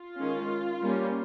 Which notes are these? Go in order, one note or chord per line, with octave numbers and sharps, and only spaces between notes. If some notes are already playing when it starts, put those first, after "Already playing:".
Already playing: F4
D#3 G#3 C#4
G3 A#3 C#4